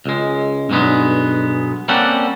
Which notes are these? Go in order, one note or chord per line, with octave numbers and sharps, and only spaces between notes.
C#2 G#3
B1 G2 F#3 G#3 B3
G3 A#3 C4 C#4 A4 F#5